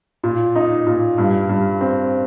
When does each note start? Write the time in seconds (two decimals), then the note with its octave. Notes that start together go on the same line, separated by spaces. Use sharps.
0.23 A#2
0.56 D#4
0.87 A#2
1.18 G2
1.49 G2
1.81 C4